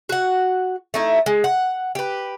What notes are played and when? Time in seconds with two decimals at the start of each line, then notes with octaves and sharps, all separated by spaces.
0.09 F#4 F#5
0.94 A3 D#4 E4
1.26 G#3
1.44 F#5
1.95 G4 B4